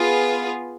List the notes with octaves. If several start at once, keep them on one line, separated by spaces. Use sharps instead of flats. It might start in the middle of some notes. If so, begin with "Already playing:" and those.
Already playing: B3 F4 G#4